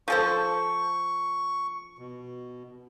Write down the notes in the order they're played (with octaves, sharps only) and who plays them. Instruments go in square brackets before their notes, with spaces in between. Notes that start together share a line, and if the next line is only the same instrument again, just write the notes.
[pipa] F3 A4 C5 [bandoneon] C#6
[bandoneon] B2